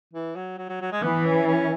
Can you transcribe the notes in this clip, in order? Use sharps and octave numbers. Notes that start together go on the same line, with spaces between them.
E3
F#3
F#3
F#3
F#3
G#3
E3 B3
C#4
C#4